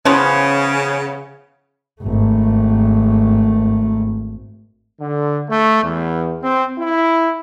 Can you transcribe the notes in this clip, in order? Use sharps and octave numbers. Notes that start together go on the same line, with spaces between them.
C#3 E3 F3 B3 C#4
G#1 A3
D3
A3
E2
C4
E4